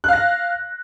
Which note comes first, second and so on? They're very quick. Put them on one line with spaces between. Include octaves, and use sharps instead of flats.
F#6 F5 A#6